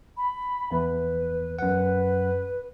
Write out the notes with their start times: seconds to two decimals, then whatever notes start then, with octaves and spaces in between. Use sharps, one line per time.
0.17 B5
0.72 E2 B4
1.59 F#2 B4 F#5